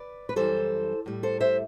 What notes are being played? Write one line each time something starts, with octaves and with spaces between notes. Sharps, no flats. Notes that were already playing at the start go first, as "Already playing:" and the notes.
Already playing: B4 D5
B4
F#2 E3 G3 A4 C5
A2 G3
A4 C5
C5 E5